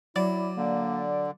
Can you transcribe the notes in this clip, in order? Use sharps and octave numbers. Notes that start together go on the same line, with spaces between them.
F#3 E4 D5
D3 A#3